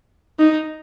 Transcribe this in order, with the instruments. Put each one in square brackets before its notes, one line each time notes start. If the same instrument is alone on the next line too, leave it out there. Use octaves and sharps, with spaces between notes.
[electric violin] D#4